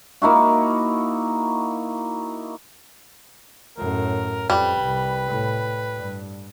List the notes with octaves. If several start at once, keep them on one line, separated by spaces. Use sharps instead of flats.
A#3 D#4 E4 F#4
F#2 A2 A#4
F2 G3 B4
C2
A2
G2